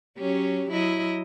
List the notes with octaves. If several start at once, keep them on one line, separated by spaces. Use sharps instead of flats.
F#3 C#4 G4
F#3 E4 D#5